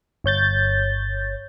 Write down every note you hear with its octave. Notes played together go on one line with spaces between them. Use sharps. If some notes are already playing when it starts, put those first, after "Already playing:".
G1 C#5 G6 A6